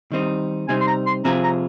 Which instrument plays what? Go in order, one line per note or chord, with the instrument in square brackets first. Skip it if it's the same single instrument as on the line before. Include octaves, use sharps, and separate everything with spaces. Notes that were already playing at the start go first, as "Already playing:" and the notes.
[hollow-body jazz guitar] D#3 G3 C4 D#4
[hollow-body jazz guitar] C3 G3 C4 D#4 [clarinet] G#5
[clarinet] C6
A#5
C6
[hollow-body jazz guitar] C3 F3 C4 F4 G#4 [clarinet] A#5
[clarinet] A#5